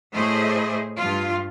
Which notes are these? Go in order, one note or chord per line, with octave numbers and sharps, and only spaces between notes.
A2 A3 E4 G#4 C5 D#5
G2 F4